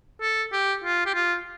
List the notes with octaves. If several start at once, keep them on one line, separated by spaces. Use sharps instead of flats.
A4
G4
F4
G4
F4